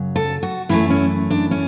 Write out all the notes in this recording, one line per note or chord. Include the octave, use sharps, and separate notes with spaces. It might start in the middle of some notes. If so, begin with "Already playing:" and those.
Already playing: F#2 C#3 F#3
A4
F#4
F#2 E3 A3 E4
C#4
D4
C#4